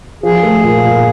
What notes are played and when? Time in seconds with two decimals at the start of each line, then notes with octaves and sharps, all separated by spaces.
0.23 F3 G#4
0.43 A3
0.64 A#2
0.84 A#2